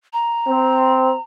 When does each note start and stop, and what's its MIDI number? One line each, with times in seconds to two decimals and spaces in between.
0.13 1.21 82
0.47 1.14 60